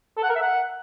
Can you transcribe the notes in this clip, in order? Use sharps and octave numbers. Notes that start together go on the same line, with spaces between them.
A4
F#5
A#4
E5
F#5